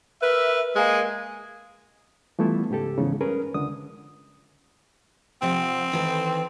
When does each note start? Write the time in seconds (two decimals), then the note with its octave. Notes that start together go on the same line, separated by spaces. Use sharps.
0.21 A#4 B4 E5
0.75 G#3 A#3 G#4
2.39 E3 G3 A3 B3 E4 F4
2.70 E2 G#2 C#3 G4 A4
2.98 E2 G#2 C#3
3.21 G2 C#4 G#4 A#4 B4
3.54 C#2 D3 D#6
5.42 C3 F3 C4 F#5
5.92 D#3 E3 A4